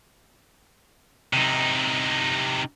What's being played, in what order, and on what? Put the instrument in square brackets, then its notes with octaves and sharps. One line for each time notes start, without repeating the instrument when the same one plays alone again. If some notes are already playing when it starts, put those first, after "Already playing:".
[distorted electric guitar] C3 D#4